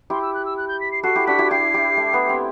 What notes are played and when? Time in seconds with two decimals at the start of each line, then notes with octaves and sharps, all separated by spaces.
0.10 E4 G4 C6
0.22 E6
0.34 F#6
0.45 E6
0.57 F#6
0.68 G6
0.81 B6
0.92 C7
1.03 F#4 A4 C7
1.16 E4 G4
1.27 D4 F#4 B6
1.39 E4 G4
1.51 E4 G4 C7
1.74 E4 G4
1.97 A3
2.13 B3
2.29 C4